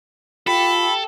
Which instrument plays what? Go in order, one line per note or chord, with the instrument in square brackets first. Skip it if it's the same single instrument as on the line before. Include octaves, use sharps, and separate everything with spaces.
[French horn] F4 [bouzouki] G4 [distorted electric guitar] A4 [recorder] B5